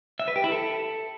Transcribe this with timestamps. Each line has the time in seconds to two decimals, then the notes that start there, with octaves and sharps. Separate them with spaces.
0.20 E5
0.28 B4
0.36 G4
0.44 E4
0.52 A4